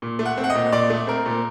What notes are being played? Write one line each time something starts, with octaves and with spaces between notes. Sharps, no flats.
A#2
A3
F#5
C4
F#5
D#5
A#2
A#2 D5
A3
C4 A#4
A#2